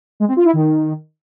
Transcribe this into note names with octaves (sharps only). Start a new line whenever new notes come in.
G#3
C4
F4
E4
D#3